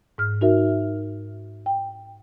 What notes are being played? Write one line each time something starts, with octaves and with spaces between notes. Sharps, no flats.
G#2 F6
D#4 F#4 A#4 E5
G5